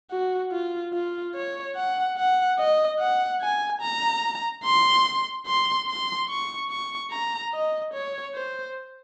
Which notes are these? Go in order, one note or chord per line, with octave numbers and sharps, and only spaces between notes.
F#4
F4
F4
C#5
F#5
F#5
D#5
F#5
G#5
A#5
C6
C6
C6
C#6
C#6
A#5
D#5
C#5
C5